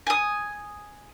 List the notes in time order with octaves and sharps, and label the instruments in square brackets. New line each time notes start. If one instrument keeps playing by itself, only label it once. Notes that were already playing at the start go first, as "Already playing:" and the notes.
[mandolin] G#5 D#6